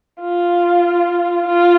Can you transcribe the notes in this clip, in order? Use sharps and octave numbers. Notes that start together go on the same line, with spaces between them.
F4
F4